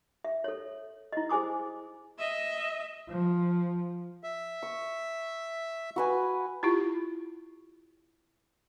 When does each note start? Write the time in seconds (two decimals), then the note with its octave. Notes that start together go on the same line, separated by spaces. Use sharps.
0.25 E5
0.44 A4 C#5
1.13 E4 D#5
1.29 G#4 C5 G#5 D6 D#6
2.19 D#5 E5
3.09 F3
4.24 E5
4.63 C#6
5.96 F#4 B4 G#5
6.63 E4 F4 G4